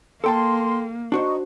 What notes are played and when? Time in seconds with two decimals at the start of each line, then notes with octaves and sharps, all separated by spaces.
0.24 A#3 A4 G5 A5 C6
1.12 D4 D#4 F#4 C5 C#6